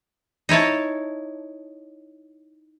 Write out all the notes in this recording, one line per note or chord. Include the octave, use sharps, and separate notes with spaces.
D#4 E4 C#5 A5